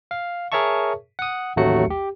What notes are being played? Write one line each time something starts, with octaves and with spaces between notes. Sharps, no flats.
F5
G#4 A#4 C#5 E5 A5 C#6
F#5 D#6
A1 D#2 F#3 A3 F#4 C#7
G4